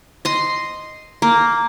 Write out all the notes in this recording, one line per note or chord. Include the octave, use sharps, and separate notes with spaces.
D#5 C6
A#3